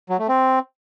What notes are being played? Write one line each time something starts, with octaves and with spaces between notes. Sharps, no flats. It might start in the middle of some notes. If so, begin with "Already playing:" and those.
F#3
A3
C4